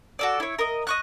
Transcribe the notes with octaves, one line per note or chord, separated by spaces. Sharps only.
F#4 A4 D5
E4 C#5
A#4 D#5
D#5 C#6 F#6